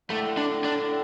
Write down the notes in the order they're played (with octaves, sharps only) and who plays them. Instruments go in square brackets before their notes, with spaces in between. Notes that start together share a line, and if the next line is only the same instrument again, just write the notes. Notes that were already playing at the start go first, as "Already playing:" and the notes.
[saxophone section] A2 D3 [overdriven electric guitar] A3
[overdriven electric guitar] D4
D4